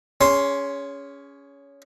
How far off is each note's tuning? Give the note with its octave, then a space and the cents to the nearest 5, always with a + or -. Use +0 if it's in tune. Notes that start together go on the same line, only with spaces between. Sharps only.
C#4 +15 G#4 -15 C6 +0